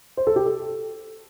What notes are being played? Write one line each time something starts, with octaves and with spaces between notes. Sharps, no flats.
C5
A4
G4
A4